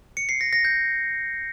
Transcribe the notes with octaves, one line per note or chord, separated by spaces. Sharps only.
C#7
C7
A#6
A#6
G6